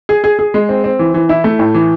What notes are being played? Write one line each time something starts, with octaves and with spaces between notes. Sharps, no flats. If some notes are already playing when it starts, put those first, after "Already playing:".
G#4
G#4
G#4
G#3
C4
C4
E3
E3
E4
A3
A2
E3